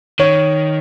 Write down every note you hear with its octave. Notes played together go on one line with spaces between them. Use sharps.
D#3 C#5